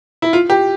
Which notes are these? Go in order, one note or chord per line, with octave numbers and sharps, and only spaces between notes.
E4
F4
G4